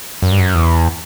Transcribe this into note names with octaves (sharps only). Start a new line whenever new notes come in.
F#2
G2
F#2
E2